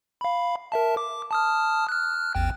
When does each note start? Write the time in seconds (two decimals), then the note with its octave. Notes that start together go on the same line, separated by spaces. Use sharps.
0.21 F5 B5
0.72 A#4 E5 A5
0.97 D6
1.31 A5 D#6 F6
1.89 F6 F#6
2.35 A1 E2 G5